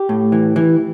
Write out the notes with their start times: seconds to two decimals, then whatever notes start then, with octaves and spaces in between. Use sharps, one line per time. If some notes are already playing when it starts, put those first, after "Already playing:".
Already playing: G4
0.09 A2
0.32 E3
0.56 E3